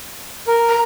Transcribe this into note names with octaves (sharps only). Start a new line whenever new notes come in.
A#4
A#5